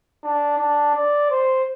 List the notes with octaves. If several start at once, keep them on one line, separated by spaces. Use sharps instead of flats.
D4
D4
D5
C5